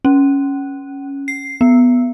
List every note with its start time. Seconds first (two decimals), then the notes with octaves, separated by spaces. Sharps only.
0.05 C#4
1.28 C7
1.61 B3